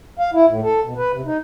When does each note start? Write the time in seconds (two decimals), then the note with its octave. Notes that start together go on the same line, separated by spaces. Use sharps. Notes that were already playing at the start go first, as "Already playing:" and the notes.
0.19 F5
0.33 E4
0.49 A2
0.63 A4
0.83 B2
0.97 B4
1.13 C3
1.26 D#4